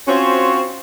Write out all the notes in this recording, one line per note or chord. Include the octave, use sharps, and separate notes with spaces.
C4 C#4 F4 F#4 C5 C#5